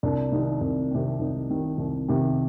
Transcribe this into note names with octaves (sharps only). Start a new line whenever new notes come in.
C2 D4
C3 D#3 D#4
C2
C3 D#3
C2 D#4
C3 D#3
C2
C3 D#3